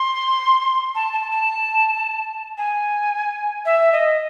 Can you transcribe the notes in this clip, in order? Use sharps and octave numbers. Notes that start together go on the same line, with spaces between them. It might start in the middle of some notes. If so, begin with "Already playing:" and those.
Already playing: C6
A5
A5
A5
G#5
E5
D#5